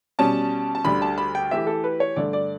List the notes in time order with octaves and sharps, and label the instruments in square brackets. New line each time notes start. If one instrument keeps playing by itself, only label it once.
[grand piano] B2 G3 C#4 [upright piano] A5
[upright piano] A5
[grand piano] D2 D3 G3 [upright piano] B5
[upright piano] A5
B5
G5
[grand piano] E3 A3 E4 G4 [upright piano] E5
[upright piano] A4
B4
C#5
[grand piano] G2 D3 A3 [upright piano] D5
[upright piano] D5